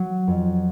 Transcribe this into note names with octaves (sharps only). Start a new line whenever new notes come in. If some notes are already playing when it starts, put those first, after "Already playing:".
Already playing: F#3
F2